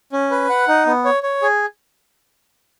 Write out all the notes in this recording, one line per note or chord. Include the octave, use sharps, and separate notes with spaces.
C#4
B4
F#5
D#4
B3
C#5
C#5
G#4